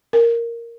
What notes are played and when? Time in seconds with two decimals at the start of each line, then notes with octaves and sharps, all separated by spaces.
0.13 A#4